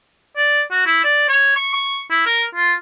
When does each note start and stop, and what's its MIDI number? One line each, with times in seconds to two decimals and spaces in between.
0.37 0.62 74
0.72 0.81 66
0.86 1.01 64
1.04 1.25 74
1.29 1.53 73
1.56 1.72 85
1.74 2.00 85
2.11 2.23 64
2.26 2.44 70
2.55 2.74 65